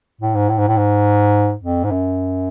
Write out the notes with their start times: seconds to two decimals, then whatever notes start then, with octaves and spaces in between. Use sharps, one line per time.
0.21 A2
0.34 G#2
0.49 A2
0.58 G#2
0.68 A2
0.77 G#2
1.63 F2
1.84 G#2
1.91 F#2